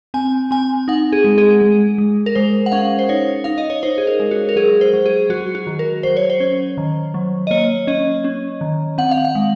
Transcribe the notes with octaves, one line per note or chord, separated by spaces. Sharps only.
C4 G#5
C4 G#5
D#4 F#5
G#4
G#3
G#4
G#3
G#3
A#4
G#3 C5
F#5
C#4 F5
C5
D#4 C#5
D#4 F5
D#5
C#5
D#4 C5
G#4
A#4
G#3
F#4
A#4
F#3 G#4
C5
F#3
G#4
F#3 F#4
F#4
D#3
A#4
F#3 C5
C#5
C5
C#4
D#3
F#3
D#5
A#3 C#5
C#4 D#5
C#4
D#3
C4 F#5
F5
F#5
G#3